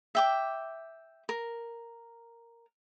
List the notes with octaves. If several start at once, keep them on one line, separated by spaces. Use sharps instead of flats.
E5 G5 D6
A#4